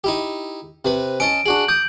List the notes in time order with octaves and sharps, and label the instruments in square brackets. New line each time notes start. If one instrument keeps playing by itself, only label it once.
[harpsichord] D#4 E4 G4
C3 B4 B5
[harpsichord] C#4 D#5 A5 [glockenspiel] D7
[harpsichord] D4 F#4 G#4 [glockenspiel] F#7
[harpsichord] D6 D#6 [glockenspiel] G6